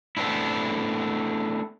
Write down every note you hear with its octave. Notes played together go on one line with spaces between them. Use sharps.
A3 B3 C4 D4 E4